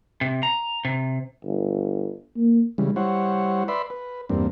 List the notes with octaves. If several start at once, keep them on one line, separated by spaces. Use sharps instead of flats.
C3
A#5
C3
G1
A#3
C#3 E3 G3 G#3
G3 E4 C5 C#5 F#5
B4 D5 E5 B5 C6
B4
E2 G2 A#3 C4 D4